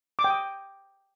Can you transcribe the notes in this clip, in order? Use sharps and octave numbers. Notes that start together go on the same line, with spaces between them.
D6
G5
D#6